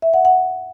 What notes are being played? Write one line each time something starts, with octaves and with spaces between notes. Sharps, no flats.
E5
F#5
F#5